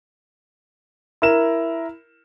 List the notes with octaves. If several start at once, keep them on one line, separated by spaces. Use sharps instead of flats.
E4 A#4 E7